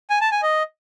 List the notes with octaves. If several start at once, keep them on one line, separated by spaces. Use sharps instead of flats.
G#5
A5
G#5
D#5